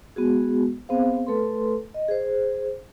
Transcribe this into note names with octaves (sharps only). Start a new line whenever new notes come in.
G#3 B3 F#4 G#4
B3 C4 G#4 C5 F5
A3 A4 B4 C6
D#5
G#4 C5